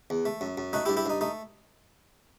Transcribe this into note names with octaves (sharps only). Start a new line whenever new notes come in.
E2
A3
F#2
F#2
A3 D#4 F#4
E4 G4
G2
E4 G4
G2 D#4
A3 D#4